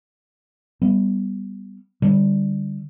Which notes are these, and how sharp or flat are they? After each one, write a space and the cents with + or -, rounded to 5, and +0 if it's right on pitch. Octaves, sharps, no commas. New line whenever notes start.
G3 +0 B3 +0
D3 +0 G3 +0